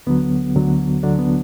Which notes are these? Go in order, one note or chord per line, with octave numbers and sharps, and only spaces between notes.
D2 D3 F#3 B3
D2 D3 F#3
D2 D3 F#3 D4
B3